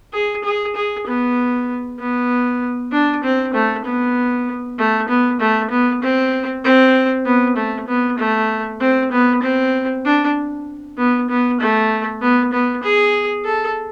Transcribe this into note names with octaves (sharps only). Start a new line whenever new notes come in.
G#4
G#4
G#4
B3
B3
D4
C4
A3
B3
A3
B3
A3
B3
C4
C4
B3
A3
B3
A3
C4
B3
C4
D4
B3
B3
A3
B3
B3
G#4
A4